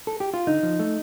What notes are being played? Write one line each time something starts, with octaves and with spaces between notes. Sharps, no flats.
A4
G4
F4
D3 D#4
F3
A3